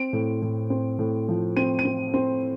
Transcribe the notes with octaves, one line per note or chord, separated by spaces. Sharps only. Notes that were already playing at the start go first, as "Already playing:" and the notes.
Already playing: C4 D7
A2
A2
C4
A2
F3
C4 D#7
D#7
C4
C4